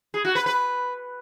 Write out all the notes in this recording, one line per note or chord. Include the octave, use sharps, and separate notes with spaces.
G#4
F#4
B4
B4